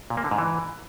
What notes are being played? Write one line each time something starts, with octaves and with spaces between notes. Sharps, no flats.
A#2
A#3
D3
G#2
E3